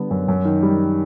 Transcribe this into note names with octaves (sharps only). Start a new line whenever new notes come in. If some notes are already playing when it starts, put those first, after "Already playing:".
Already playing: D3 G3 B3
F#2
F#2
D#3
G3